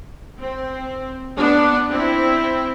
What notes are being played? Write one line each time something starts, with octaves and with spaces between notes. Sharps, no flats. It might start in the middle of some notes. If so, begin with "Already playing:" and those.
C4
B3 D4
C4 E4